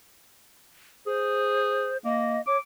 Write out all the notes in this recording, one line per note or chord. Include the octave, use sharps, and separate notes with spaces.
G#4 C5
A#3 D#5
C#5 D6